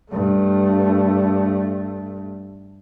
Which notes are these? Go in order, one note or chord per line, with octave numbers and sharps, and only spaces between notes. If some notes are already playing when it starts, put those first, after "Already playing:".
G2 A3